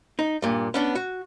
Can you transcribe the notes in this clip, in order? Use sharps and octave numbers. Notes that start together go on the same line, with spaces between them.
D#4
G2 A#2
B3 C#4 D4
F#4